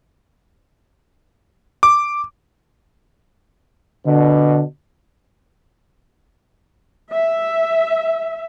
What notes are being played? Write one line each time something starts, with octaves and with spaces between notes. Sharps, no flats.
D6
B2 D3 D4
E5